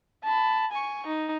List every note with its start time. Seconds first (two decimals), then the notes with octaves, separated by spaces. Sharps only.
0.24 A5 B5
0.72 G#5 C#6
1.06 D#4